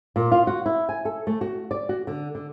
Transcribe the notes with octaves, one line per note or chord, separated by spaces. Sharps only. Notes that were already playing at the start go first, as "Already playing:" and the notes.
A#2
F4
F#4
E4
G#5
A4
A3
F#4
D5
F#4
D3
D3